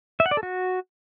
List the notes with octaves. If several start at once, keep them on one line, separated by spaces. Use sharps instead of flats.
E5
F#5
D5
A4
F#4